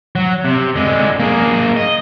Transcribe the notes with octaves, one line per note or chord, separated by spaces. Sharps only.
F#3
C3
D3 G#3
A#3 G#4
D#5